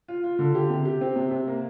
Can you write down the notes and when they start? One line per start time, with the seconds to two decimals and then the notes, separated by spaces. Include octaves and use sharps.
0.08 F4
0.24 F4
0.39 D3
0.55 G4
0.70 C3
0.85 G4
1.01 C4
1.16 C3
1.31 C3
1.48 A#3